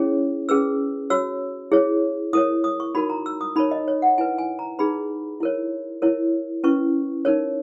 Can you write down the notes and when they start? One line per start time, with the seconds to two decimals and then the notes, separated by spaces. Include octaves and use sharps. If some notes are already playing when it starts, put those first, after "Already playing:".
Already playing: C#4 E4 G#4 C#5
0.49 C#4 G#4 B4 E6
1.10 F#4 C#5 E6
1.72 E4 G#4 C#5
2.33 E4 A#4 C#5 D#6
2.64 D#6
2.80 C#6
2.95 D#4 F#4 A#4 B5
3.10 A#5
3.26 E6
3.41 D#6
3.56 D#4 A#4 C#5 B5
3.71 D#5
3.88 C#5
4.02 F#5
4.18 E4 B4 G#5
4.38 G#5
4.59 A#5
4.79 D#4 G#4 B4 B5
5.40 E4 A#4 C#5
6.02 E4 A#4 C#5
6.64 C#4 E4 B4 C#6
7.25 D#4 A#4 C#5